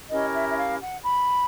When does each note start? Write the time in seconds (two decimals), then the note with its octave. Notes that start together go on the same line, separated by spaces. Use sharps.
0.10 C#4 E4 G4 A#4 D#5
0.34 E5
0.50 E5
0.57 F5
0.81 F#5
1.04 B5